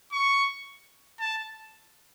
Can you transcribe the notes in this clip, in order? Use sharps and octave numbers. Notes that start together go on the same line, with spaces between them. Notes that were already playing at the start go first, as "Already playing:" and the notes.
C#6
A5